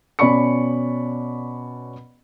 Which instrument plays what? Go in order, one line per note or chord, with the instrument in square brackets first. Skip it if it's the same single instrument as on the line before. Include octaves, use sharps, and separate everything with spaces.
[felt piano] B2 C#4 D5 B5 C#6 C#7